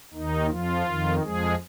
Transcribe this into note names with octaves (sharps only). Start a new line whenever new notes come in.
D#2 D#3 D#4
F2 F3 F4
F2 D#3
F2 F3 G#3 G#4